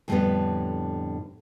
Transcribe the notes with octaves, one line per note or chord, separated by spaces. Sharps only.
F2 A2 D3 G3 B3 A4